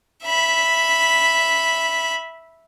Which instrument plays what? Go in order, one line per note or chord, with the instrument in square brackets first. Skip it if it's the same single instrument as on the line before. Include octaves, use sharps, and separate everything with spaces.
[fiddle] E5 B5